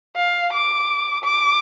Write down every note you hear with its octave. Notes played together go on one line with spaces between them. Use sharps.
F5
D6
D6